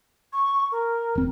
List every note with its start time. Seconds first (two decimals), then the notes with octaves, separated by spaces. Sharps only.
0.33 C#6
0.72 A#4
1.15 E1 C4